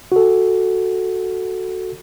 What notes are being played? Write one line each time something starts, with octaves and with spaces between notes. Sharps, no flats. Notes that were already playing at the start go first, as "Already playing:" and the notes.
F#4 A4